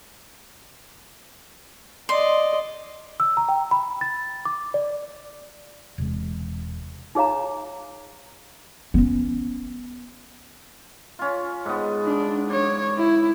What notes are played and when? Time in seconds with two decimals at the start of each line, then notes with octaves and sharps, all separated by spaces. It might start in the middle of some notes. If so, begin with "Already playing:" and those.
2.09 D5 D#5 C6
3.20 E6
3.37 A#5
3.49 G5
3.71 B5
4.01 A6
4.45 D6
4.74 D5
5.98 E1 C3 G#3
7.15 D#4 G#4 C#5 F5 A#5
8.94 B3 C#4
11.19 C#4 F4
11.65 G#2 B3
12.05 D4
12.50 C#5 D5
12.98 E4